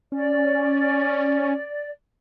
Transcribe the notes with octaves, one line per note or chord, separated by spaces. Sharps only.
C#4 D5